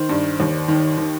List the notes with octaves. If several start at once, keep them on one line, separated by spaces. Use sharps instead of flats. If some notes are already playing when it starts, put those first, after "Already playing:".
Already playing: D#3 C5
G2
D#2
D#3
D#3